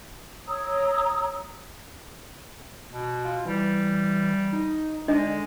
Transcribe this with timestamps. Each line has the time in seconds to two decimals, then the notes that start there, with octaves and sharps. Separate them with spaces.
0.48 C#5 A#5 D#6 E6
2.93 B2
3.25 F4
3.46 E3 G3
4.53 D#4
5.08 D3 G#3 D4 D#5